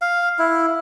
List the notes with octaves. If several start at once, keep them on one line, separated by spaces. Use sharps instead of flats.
F5
E4